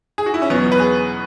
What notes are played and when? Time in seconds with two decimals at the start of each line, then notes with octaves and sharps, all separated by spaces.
0.18 G#4
0.26 F#4
0.34 E4
0.42 C#4
0.50 E2 B2 F#3 B3
0.72 B4
0.80 G#4